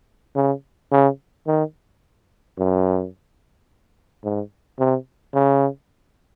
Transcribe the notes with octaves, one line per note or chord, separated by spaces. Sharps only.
C#3
C#3
D#3
F#2
G#2
C3
C#3